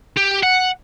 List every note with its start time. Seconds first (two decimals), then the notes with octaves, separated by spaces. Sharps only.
0.17 G4
0.43 F#5